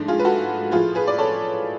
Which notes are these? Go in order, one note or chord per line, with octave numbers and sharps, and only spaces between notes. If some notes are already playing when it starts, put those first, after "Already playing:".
Already playing: G#2 F3 A3 D4
F4 G#4
B4
F#4 A4
A2 F3 A3 F4 G#4
G#4 B4
D5
A4 C#5